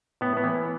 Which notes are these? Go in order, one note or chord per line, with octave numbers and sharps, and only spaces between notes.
A2 B3
B3
E3